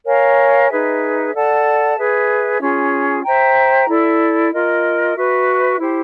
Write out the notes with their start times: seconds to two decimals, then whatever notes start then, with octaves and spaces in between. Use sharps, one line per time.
0.05 A#4 C#5 F5 G#5
0.68 D#4 G#4 B4 E5
1.33 A4 D5 F#5 A5
1.97 G#4 B4 E5
2.60 C#4 F4 G#4
3.24 C5 E5 G5 A#5
3.88 E4 A4 D5
4.52 F4 A#4 D#5
5.16 F#4 B4 E5
5.79 E4 G4 C5